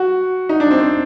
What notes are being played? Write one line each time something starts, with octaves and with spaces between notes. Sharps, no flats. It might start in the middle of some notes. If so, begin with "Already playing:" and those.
Already playing: F#4
D#4
D4
C4
C4